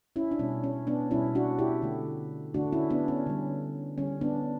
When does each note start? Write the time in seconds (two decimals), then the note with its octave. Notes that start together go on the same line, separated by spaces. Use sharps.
0.16 C#4 E4
0.31 D4
0.39 B2 G3 C#4
0.64 C#4
0.87 B3 D4
1.11 B2 G3 C#4 E4
1.35 D4 F#4
1.59 E4 G4
1.82 D3 A3
2.54 D3 A3 D4 F#4
2.72 C#4 E4
2.90 B3 D4
3.08 C#4
3.26 D3 G3
3.98 D3 G3 C#4
4.21 B3 D4